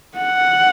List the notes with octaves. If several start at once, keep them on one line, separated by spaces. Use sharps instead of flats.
F#5